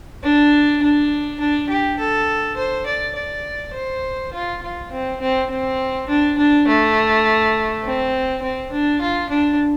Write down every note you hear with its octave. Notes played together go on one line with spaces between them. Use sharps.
D4
D4
D4
G4
A4
C5
D5
D5
C5
F4
F4
C4
C4
C4
D4
D4
A3
C4
C4
D4
F4
D4